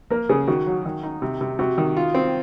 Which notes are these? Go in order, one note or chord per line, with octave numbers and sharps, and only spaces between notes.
A#3 A#4
C#3 G#4
D#3 F#4
F#3
D#3
D#4
C3
C3
C3 F#4
D#3
F4
C4